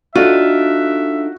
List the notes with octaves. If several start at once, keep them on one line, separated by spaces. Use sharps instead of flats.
D4 D#4 F4 F#4 A4 E5